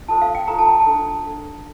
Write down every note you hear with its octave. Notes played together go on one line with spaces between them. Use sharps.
F4 A4 C5 A5
F5
G5
F4 A4 C5 A#5
A5
G5
A5
D4 A4 C5
D4 A4 C5